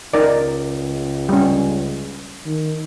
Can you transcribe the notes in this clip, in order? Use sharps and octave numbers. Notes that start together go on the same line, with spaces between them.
C#2 D#4 A#4 D5
G3 C#4
D#3